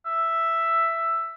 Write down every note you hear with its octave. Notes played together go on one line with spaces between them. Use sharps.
E5